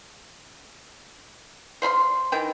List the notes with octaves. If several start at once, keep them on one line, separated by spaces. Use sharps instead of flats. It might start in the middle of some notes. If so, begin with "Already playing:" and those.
C5 F5 B5 C6
D#3 E3 G5